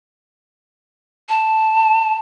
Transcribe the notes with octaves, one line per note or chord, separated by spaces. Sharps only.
A5